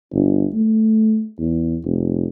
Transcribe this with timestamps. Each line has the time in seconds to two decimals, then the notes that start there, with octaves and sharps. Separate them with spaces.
0.12 G1
0.53 A3
1.39 E2
1.85 F1